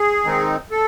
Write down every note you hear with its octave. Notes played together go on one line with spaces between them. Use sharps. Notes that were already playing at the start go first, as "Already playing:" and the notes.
Already playing: G#4
D#3 G#3 C4 D#4
A4